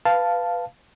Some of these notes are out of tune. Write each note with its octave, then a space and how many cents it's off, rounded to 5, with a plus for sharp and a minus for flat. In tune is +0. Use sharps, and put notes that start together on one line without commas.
B4 +5 F5 -5 A5 +0